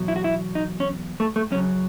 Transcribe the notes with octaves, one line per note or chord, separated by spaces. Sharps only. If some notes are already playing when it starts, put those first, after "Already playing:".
Already playing: E2 B2 F#3
E4
F#4
E4
D#4
C#4
A3
A3
F#2 C#3 F#3 C#4